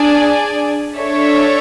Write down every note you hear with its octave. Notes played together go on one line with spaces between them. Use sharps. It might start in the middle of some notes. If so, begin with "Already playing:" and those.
Already playing: D4 G#4 D5 G#5
D4 A4 C#5 E5